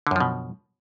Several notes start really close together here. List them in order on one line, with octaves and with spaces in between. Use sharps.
D3 F#2 F3 B2